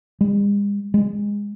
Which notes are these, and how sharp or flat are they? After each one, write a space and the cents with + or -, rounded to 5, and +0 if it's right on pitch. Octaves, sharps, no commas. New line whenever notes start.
G#3 -45
G#3 -20